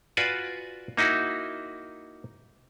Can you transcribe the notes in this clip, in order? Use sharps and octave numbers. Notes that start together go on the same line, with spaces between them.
F4 F#4 B4 D5 G#5
A#3 D#4 E4 F#4